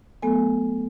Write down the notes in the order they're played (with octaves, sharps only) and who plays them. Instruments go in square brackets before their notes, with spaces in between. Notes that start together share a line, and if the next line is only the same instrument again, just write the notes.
[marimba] F#3 A3 B3 A4 G#5